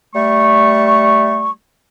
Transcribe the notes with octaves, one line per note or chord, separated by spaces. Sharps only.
G3 A3 C#6